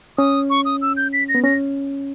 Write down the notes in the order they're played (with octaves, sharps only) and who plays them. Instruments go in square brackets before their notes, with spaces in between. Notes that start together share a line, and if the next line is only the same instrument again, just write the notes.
[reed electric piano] C#4 [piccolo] D#6
[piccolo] C#6
D#6
E6
G6
B6
A#6
[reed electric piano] B3
[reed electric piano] C#4 [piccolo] A#6